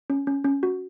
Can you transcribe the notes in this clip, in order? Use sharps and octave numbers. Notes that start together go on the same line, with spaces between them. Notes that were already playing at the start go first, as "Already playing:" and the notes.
C#4
C#4
C#4
F#4